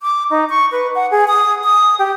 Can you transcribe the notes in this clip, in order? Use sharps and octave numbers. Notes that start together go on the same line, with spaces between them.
D6
D#4
C#6
B4
F#5
G#4
D#6
D#6
G4